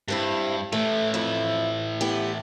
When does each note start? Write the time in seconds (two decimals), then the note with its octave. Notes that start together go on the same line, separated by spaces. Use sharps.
0.08 G2 G3 C4 E4
0.72 A2 E3 A3
1.14 F2 E4
2.01 B3 E4 G4